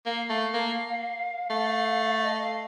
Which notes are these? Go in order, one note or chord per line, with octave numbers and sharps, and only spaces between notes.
A#3 F5
A3
A#3
A3
F5
D#5
F5